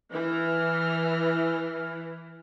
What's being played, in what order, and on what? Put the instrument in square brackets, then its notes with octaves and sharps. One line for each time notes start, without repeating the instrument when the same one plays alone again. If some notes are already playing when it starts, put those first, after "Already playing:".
[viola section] E3 [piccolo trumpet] F6